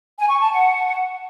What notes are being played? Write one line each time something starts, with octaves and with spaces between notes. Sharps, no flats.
G#5
C#6
A5
F#5